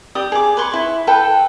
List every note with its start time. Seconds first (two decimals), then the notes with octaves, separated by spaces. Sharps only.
0.15 G4 D5 D#6
0.32 G#4 D6
0.57 B4 C#5 C6 C#6
0.74 E4
1.07 A4 B4 G5